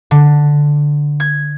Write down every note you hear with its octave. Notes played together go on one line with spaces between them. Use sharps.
D3
G#6